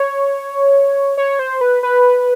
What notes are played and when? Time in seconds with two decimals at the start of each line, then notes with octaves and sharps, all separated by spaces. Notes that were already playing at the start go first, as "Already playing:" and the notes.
Already playing: C#5
1.17 C#5
1.39 C5
1.61 B4
1.83 B4